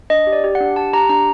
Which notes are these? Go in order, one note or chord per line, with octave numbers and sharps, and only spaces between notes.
D4 D#5
G4
D5
G4
F#5
D4
G4 A5
G4 A#5
D4 A#5